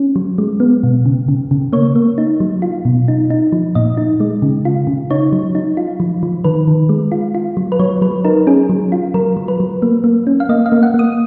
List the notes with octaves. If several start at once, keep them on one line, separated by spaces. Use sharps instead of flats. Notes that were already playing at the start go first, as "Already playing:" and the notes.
Already playing: C#4
F#3
G#3
B3
B2
C#3
C#3
C#3
A#3 C#5
A#3
D#4
F#3
F4
B2
D#4
D#4
F3
A#2 D#5
D#4
G#3
C#3
F4
C#3
D#4 C#5
F#3
D#4
F4
F3
F3
D#3 B4
D#3
G#3
F4
F4
F#3
B4
F#3 C#5
F#3 B4
D#4 A#4
C#4 G#4
F#3
F4
F#3 A#4
F#3
B4
F#3
A#3
A#3
C#4
F5
A#3 D#5
F5
A#3
F#5
A#3
D#6